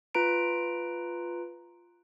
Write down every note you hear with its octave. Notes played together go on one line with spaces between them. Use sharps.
F4 B4 A#5 D7